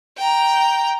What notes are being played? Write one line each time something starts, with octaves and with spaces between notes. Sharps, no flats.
G5 A#5